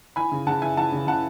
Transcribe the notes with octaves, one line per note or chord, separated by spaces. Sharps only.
E3 G#5 B5
C#3
C#3 F#5 A5
E3 E5 G#5
E3 F#5 A5
C#3
C#3 F#5 A5